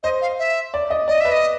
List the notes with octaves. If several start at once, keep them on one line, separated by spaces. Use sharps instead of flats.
C5 D#5
F5
E5
D5
D#5
D5 D#5
B4 E5
D#5